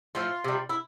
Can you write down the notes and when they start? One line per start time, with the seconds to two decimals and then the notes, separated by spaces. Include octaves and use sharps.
0.15 A2 F3 A3 F4
0.44 C3 G3
0.69 E4